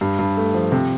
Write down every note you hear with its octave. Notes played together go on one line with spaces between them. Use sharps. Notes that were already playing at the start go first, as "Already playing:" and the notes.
G2
G2
A3
F3
C3